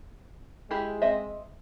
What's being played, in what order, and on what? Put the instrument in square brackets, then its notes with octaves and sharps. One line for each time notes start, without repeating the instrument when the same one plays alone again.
[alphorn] G#3 [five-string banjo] E4 G4 G#4
[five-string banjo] C4 D#5 E5